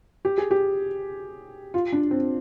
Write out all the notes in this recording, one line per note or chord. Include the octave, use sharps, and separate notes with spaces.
G4
G#4
G4
F4
D4
C4